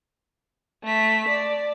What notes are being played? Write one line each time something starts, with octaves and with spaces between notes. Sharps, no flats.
A3 B6
D5